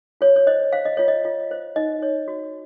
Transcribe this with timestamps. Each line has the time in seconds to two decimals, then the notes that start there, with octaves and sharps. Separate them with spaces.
0.21 F4 C#5
0.36 C#5
0.47 C5 D#5
0.73 C5 F5
0.85 D#5
0.97 F4 C#5
1.08 D#5
1.25 F4
1.51 C5
1.76 D#4 D#5
2.02 C#5
2.28 F#4